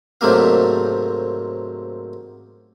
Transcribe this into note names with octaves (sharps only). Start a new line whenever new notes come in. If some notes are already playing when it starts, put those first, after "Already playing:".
G#2 C3 F#3 A3 A#3 F5